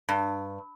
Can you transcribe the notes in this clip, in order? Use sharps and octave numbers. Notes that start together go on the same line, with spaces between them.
G2